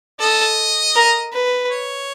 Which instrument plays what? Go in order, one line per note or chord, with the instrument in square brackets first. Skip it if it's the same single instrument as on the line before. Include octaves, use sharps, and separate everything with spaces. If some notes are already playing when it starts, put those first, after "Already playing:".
[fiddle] A4 [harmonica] D#5
[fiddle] A#4
B4
[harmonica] C#5